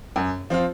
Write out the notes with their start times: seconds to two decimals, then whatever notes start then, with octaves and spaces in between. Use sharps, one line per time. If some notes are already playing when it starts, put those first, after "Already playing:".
0.16 F#2
0.50 F3 C4 F4